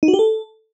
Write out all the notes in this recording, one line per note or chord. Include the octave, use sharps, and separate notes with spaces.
D#4
F#4
G4
A4